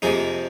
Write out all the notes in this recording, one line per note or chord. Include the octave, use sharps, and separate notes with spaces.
F2 C3 F3 A#3 D#4 G#4